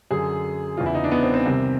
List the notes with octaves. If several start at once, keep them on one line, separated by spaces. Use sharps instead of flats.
F#2 D3 G#4
E2 C#3 E3 F4
E4
D#4
D4
B3
C4
C4
C2 C3 D#3